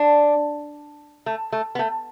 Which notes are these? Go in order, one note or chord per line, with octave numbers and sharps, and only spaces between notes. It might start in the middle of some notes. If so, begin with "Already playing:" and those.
Already playing: D4
A3
A3
B3
A3